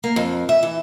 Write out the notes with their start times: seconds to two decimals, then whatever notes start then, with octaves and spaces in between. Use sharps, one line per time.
0.04 A#3
0.16 F2
0.49 E5
0.63 E3